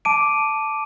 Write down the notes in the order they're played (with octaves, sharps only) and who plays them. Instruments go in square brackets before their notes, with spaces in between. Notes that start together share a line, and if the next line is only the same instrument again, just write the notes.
[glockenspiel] A5 D6 D7 D#7